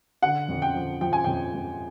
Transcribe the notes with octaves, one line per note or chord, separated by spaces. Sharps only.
D3 F#5
F2
G5
F3
F3 G5
G#5
F2 G5
F2